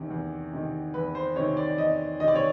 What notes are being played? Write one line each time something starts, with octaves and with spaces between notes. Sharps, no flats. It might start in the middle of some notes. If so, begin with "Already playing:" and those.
Already playing: E2 C3 D#3
E2
C3 D#3
E2 B4
C5
C3 D#3 C#5
D5
E2 D#5
C3 D#3 D5 D#5
C#5